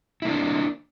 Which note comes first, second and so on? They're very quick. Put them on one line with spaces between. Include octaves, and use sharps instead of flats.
E4 A#3 D4